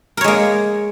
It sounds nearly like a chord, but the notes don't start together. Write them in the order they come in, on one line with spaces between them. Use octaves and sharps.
A#4 C#5 G#3 A#3